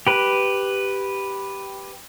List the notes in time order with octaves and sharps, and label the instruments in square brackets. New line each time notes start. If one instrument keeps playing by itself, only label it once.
[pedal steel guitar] G4 B4